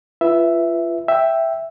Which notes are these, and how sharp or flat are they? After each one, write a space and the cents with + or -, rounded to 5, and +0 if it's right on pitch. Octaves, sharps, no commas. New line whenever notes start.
F4 -30 B4 +0 E5 +0
E5 +0 G5 +0